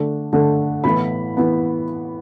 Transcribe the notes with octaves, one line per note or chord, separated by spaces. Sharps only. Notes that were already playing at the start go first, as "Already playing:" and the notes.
Already playing: D3 A3 D4
D3 A3 D4
A2 E3 B3 B5
E3 B3